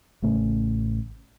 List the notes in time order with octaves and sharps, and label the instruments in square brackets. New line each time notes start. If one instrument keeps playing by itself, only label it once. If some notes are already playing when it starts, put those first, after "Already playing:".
[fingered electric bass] A1 C#3 A3 C#4